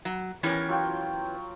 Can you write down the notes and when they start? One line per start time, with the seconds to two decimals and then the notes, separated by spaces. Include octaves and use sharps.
0.05 F#3
0.43 E3 B3 C#4 G4 A#4 C#5
0.69 F#3 F4 G5